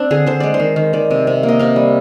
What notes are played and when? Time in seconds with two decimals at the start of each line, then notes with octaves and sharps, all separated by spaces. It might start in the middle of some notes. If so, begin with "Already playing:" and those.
Already playing: C4 D4
0.11 D3 G#4
0.27 D3 C5
0.40 G#3 D5
0.54 C5
0.60 D#3
0.76 D#3
0.93 D#3 D5
1.11 C3
1.27 C3
1.43 A#3
1.49 D#5
1.59 C3 F5
1.76 G3